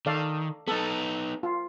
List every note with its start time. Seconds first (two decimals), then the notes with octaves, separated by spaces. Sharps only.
0.06 D#3 A4 D5 F5
0.68 B3 D#4 A4
1.43 F4